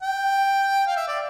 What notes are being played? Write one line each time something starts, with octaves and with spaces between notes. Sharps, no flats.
G5
F5
E5
D5